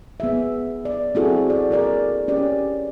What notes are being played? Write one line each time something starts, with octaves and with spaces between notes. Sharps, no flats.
B3 G#4 E5
D5
C4 E4 F#4 G#4 A4
D5
G#4 A#4 D5
C#4 G4 D5